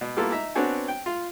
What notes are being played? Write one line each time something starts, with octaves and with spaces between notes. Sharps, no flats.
B2
G3 A#3 B3 E4 F4 A4
D#4 E5 A#5
B3 C4 D4 F#4 C#5 G#5
G5
F4